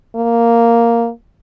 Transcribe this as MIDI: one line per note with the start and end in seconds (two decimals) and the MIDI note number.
0.16 1.10 58